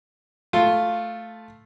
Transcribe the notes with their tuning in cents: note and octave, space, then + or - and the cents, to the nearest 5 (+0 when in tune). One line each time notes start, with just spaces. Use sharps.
A3 +0 F4 +0